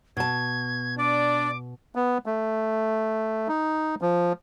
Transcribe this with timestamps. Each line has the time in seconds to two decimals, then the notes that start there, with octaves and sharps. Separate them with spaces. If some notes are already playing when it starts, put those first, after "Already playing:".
0.17 B2 A5 G#6
0.98 D4 D5 D6
1.95 B3
2.26 A3
3.48 D#4
4.01 F3